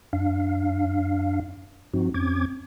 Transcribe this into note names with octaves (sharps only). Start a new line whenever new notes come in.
F#2 D4 F5
G2 F3 C4 D#4 F#4
F2 C4 C#4 D6 G#6